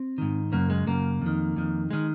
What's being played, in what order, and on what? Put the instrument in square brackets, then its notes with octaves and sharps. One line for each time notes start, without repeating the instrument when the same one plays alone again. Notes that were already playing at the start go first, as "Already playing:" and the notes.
Already playing: [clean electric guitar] C4
G#2 D#3
F#2 C#3 A#3
G#3
F#2 C#3 A#3
F2 D#3
F2 D#3
D#3 G#3